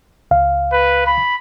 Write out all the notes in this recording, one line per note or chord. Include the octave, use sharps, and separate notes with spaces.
C#2 F5
B4
B5